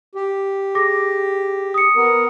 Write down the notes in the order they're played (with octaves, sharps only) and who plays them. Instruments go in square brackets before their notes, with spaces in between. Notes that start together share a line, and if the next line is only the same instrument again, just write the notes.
[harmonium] G4
[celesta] G#4 D6 A#6
D#6 C#7
[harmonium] B3 A#4